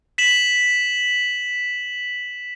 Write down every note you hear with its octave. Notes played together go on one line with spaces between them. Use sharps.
B6 E7 F#7